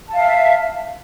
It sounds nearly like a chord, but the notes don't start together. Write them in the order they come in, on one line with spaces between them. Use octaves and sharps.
A5 F5 E5